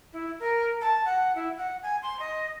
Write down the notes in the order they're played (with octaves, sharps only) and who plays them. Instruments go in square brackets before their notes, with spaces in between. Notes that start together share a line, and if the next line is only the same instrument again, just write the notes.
[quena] E4
A#4
A5
F#5
E4
F#5
G#5
C6
D#5